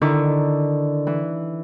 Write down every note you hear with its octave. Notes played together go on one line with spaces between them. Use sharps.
D3 D#3 E4 C#6 D6
E3